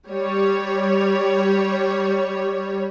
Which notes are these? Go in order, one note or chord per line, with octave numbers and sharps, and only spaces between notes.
G3 C#5